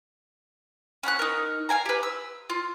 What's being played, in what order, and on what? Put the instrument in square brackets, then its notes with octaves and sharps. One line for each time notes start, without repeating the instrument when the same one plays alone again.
[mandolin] C#4 F#5 A#5 F#6
D#4 A#4
F5 G5 G#5 A#5
G4 B4
E6
F4